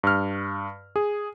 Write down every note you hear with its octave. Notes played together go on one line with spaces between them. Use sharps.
G2 F6
G#4